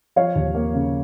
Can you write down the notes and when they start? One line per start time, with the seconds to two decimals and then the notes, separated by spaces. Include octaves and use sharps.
0.16 F3 C#5 F5
0.35 D#2
0.54 A#3
0.74 C#3